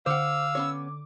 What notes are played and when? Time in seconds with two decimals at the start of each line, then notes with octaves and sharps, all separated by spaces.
0.06 D3 C5 F5 F#5 D6 E6
0.55 B3 C#4 C#5